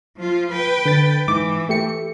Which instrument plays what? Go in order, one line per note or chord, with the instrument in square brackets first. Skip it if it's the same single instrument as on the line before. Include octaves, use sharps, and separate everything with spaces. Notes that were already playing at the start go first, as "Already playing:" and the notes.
[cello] F3 F4
B4 G5
[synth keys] D3 A6
[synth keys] G#2 D6 [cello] E3
[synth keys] A3 G4 C#7